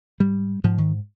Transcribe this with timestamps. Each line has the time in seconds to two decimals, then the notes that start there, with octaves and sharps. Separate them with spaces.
0.20 G#2 G3
0.64 G#2 F3
0.78 D#3